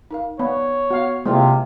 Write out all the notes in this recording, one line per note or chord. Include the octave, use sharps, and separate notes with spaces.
D#4 A#4 F5
B3 C#5 D5 F5 B5
B3 F#4 F5
C3 G#3 A#3 E4 F4 C5 D5 G5